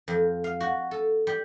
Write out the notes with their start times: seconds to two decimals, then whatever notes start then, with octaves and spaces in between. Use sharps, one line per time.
0.08 F2
0.44 F5
0.60 F#4
0.91 A4
1.27 G3